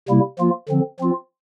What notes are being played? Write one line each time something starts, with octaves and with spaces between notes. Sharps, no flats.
C3 G3 A#3 E4
F3 A#3 F4
D3 F3 C4
F3 C4 F4